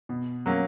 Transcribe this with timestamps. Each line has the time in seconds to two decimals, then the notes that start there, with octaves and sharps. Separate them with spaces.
0.09 B2
0.46 F#3 A#3 C#4